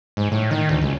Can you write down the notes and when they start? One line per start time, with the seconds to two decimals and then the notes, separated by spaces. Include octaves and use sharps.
0.17 G#2
0.32 A2
0.51 D#3
0.69 D2
0.82 C#2